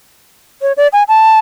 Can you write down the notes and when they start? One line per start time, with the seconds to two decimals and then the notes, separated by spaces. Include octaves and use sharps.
0.62 C#5
0.77 D5
0.93 G#5
1.08 A5